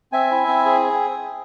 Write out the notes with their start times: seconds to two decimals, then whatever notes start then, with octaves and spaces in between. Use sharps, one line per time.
0.12 C4 E5 G#5
0.31 E4
0.48 C4
0.65 G#4